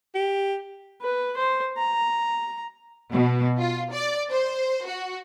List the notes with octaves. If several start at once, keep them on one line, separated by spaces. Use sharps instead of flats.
G4
B4
C5
A#5
B2
F4
D5
C5
F#4